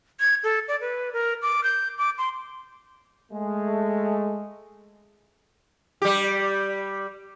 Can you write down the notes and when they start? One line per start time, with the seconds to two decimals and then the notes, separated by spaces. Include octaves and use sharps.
0.20 G#6
0.44 A4
0.68 D5
0.81 B4
1.13 A#4
1.42 D6
1.64 G6
1.98 D6
2.18 C6
3.32 G#3 A3
6.02 G3 G4